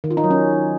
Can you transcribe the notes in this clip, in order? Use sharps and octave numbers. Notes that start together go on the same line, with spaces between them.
D#3
F4
D#4
F#3
C#4